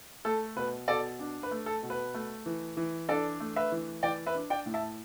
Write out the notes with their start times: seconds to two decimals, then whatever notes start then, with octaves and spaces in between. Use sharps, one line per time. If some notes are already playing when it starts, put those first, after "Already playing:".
0.25 A3 A4
0.56 B2 B4
0.88 B2 A4 D5
1.19 D4
1.43 B4
1.51 A3
1.66 A4
1.82 B2
1.90 B4
2.14 A3
2.46 E3
2.77 E3
3.09 D4 A4 D5
3.40 A3
3.56 B4 E5
3.72 E3
4.03 E3 D5 G5
4.26 B4 E5
4.35 D4
4.50 D5 G5
4.66 A2
4.74 E5 A5